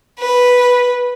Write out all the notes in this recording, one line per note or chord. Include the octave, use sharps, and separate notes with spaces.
B4